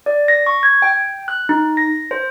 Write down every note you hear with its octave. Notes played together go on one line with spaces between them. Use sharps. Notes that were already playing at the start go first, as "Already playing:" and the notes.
D5
A#6
C#6
G#6
G5
F#6
D#4
A#6
C5